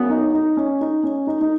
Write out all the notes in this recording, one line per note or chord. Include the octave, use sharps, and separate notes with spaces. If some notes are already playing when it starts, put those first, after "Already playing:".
Already playing: F#2 C#3 F#3 B3
D#4
D#4
C#4
D#4
C#4
D#4
D#4